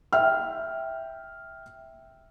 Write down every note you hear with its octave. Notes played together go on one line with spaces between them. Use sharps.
E5 G5 F6